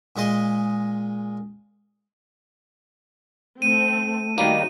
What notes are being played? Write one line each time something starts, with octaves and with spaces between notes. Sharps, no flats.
A#2 G#3 D#5 C6
A3 C4 D#7
D#3 G3 A#3 D#4 F#4 D#7